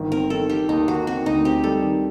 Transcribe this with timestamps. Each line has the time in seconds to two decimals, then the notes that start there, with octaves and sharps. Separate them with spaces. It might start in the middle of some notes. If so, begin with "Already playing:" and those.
Already playing: G1 D#3
0.12 C4 A#4
0.30 D#3 A4
0.49 D#3 G4
0.69 D#2 D#4
0.88 D#3 F#4
1.07 C4 F#4
1.26 D2 D#4
1.45 C4 G4
1.64 G3 A4
1.83 D#3